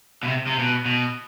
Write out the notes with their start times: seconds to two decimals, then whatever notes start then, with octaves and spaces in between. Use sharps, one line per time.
0.23 B2
0.28 C3
0.47 C3
0.59 B2
0.86 B2